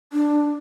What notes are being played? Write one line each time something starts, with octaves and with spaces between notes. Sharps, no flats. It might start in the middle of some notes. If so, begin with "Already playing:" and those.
D4